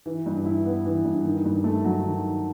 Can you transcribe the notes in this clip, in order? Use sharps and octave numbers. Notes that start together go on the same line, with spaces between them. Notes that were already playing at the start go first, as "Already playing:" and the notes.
E3
G2
E4
B3
E3
G2
D#3
G2
A3
F#3
D#3